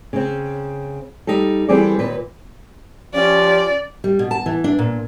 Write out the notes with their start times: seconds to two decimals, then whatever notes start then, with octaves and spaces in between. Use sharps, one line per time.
0.13 C#3 C4
1.27 G3 D#4 G4 A4
1.69 E3 G3 C4 G#4 A4 D5
1.99 D#2 A#2 B4
3.14 F3 C#4 F4 G4 D5
4.04 G3
4.19 B2
4.31 A5
4.46 E3
4.64 D4
4.79 A#2